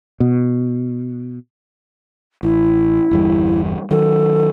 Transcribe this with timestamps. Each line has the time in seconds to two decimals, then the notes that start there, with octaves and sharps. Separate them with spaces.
0.20 B2
2.43 A1 E4
3.11 G1 E2 G3
3.91 D#3 F#3 A4